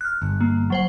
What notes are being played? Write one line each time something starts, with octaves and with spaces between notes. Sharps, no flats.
F6 F#6
G1
A#3
F#3 C5 F#5